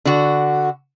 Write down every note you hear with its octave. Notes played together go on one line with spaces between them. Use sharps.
D3 F#4